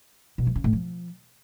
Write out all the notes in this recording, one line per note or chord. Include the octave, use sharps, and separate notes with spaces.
B2
E3
C#3
A2
F3